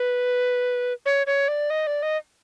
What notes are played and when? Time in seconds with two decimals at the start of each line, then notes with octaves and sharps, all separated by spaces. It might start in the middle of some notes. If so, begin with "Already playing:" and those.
Already playing: B4
1.06 C#5
1.27 C#5
1.48 D5
1.70 D#5
1.87 D5
2.03 D#5